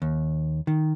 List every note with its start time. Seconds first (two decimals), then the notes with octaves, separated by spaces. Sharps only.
0.02 D#2
0.67 D#3